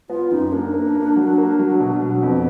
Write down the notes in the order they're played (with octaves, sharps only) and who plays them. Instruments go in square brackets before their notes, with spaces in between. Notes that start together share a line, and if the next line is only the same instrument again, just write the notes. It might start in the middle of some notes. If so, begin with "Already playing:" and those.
[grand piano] B3 [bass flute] F4
[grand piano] F#2 [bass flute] D#4
[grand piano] A#3 [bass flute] D4
[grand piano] A#3
A#3
F#3
A#3
F#3
B2
F#3
[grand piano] F2 [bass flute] B3